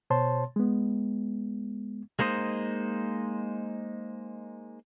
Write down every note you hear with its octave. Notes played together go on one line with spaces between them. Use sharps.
B2 C5 C#5 A5 C6
G#3 B3
G#3 A#3 D#4 C5 D#5